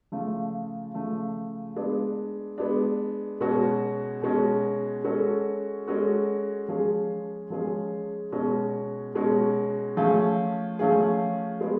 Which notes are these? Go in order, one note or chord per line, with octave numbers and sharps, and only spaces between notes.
C#3 F3 A3 F4
C#3 F3 A3 F4
G#3 B3 D4
G#3 B3 D4
B2 G#3 C#4 F#4
B2 G#3 C#4 F#4
G#3 C#4 F#4 A4
G#3 C#4 F#4 A4
F3 G#3 C#4 G#4
F3 G#3 C#4 G#4
B2 G#3 C#4 F#4
B2 G#3 C#4 F#4
F3 A3 C#4 F4 G#4
F3 A3 C#4 F4 G#4
G#3 B3 F4